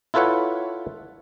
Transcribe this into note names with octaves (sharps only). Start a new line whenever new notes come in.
E4 F4 A4 B4 C#5 F#5